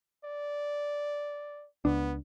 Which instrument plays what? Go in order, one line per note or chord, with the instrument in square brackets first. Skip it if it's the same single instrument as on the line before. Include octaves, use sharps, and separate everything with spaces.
[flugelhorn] D5
[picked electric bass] C#2 D4 [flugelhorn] B3